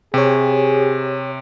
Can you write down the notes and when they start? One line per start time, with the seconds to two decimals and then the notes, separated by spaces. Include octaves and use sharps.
0.14 C3 G4 G#4 C#5